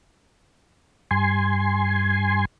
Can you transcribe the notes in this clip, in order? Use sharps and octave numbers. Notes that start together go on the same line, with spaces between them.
G2 G#5 C6